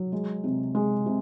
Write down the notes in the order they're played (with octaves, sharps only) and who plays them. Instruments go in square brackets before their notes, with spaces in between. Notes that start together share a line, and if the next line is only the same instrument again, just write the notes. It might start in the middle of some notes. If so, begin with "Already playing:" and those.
Already playing: [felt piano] F#3
G#3
C3
G#3
C3